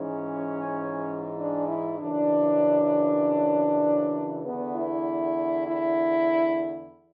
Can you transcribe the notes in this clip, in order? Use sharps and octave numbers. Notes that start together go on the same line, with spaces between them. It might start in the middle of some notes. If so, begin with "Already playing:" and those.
Already playing: G#2 E3 C#4
D4
E4
F#2 C#3 E3 D4
E2 D3 B3
E4
E4